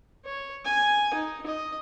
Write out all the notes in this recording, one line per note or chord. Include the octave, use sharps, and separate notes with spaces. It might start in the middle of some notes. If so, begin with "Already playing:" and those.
C#5
G#5
D#4
D#5